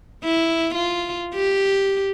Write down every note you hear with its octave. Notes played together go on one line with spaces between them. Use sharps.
E4
F4
G4